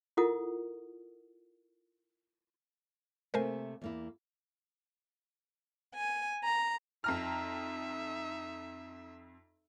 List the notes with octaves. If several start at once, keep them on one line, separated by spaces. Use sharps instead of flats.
E4 F4 A4 A#4 F#5 D#6
C3 A3 A#3 A#4 C5 G#5
E2 A#3 E4
G#5
A#5
F2 D#4 E5 A#5 F6